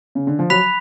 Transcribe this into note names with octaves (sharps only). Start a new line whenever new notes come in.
C#3
D3
F3
F#3 B5 F#6 B6 F7